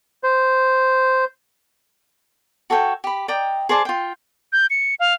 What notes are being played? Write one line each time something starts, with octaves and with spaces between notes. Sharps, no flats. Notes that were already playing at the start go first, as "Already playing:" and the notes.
C5
F#4 A4 C#5 G5
G4 B5
D5 D#5 G5 A#5
G#4 C5 D5 A5
F4 G5
G6
C#7
F5